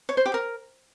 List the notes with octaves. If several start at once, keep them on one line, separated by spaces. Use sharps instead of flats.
C#5
C5
G4
A#4